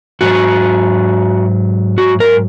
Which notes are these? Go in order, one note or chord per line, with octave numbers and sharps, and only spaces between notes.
G#2 F#3 F#4
F#4
A#4